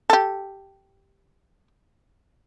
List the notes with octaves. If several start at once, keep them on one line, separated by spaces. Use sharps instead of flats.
G4 A4